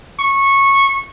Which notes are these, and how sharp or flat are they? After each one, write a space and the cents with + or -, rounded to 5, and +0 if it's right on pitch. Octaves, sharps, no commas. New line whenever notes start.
C#6 -15